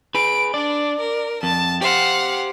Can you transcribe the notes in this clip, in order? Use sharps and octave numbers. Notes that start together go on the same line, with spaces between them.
G#4 B4 D7
D4 D5
A#4
F2 A5
G4 C5 F5 F#5